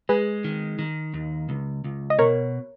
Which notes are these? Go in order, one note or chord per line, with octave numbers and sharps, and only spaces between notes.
G#3 G#4 B4
D#3
D#3
D#2
C#2
C#2
D#5
B2 A#4 C#5